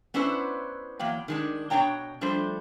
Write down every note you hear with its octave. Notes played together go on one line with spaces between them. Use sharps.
B3 C#4 D4 E4 B4 C5
E2 F#3 A#3 G5
D#3 G#3 D4
B2 D4 C#5 G5 A#5
F3 G3 A3 D4 C5